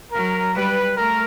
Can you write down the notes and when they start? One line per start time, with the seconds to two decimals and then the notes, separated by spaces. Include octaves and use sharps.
0.12 F#3 A#4
0.55 G3 B4
0.96 A3 A#4